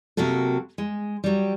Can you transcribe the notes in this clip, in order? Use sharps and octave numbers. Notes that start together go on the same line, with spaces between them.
C3 F#3 A#3 F#4 A4
G#3
F#3 G3